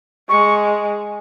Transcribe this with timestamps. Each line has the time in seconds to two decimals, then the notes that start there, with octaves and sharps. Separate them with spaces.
0.29 G#3 C#6